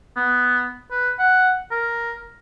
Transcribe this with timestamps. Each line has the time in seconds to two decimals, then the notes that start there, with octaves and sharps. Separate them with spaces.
0.17 B3
0.91 B4
1.19 F#5
1.71 A#4